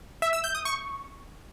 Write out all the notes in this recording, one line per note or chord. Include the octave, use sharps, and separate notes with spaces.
E5
E6
G6
D#6
C#6